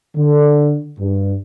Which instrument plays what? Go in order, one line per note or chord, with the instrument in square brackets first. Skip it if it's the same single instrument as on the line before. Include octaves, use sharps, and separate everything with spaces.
[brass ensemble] D3
G2